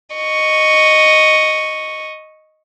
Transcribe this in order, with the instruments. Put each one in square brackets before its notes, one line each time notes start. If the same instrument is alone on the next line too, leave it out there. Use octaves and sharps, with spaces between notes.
[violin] D#5 C#6